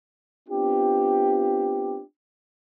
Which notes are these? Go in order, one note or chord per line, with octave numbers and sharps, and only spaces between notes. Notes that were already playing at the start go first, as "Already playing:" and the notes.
B3 C4 D4 F4 G4